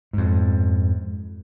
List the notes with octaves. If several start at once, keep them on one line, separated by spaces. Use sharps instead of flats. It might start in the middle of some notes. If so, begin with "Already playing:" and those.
F2 G#2